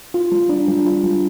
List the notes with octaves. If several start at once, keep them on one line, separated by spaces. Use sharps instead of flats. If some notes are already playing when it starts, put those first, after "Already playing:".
F4
G3
D4
G3
F4
G3